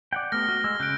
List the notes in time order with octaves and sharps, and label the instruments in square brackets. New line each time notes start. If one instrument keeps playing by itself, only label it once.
[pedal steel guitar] D5 F#5 G5
[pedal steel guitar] A3 B3 G4 [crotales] F6 A#6
[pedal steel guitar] F#4
G#3 E6
[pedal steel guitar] C#3 F#6 [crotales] G6 D7